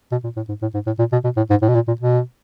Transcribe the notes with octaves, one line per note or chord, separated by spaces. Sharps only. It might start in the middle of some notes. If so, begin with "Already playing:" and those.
B2
A#2
A2
G#2
A2
G#2
A2
A#2
B2
B2
A2
G#2
A2
B2
A#2
A#2
B2